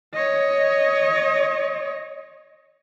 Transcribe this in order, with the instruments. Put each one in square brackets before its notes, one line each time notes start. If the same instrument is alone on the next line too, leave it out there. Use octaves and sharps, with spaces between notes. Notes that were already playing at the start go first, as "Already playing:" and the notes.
[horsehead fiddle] C#5 D#5